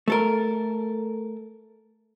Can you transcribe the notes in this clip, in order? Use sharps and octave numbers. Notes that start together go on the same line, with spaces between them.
A3 A4 A#4